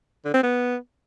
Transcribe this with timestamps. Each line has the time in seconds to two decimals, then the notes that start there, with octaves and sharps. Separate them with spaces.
0.25 D3
0.34 C4
0.43 B3